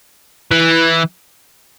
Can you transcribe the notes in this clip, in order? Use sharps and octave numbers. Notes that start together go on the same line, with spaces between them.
E3